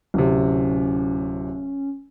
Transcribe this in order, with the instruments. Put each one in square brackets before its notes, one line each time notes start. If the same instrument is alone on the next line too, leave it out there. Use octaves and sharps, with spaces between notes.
[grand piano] D1 C3 [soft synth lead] C#4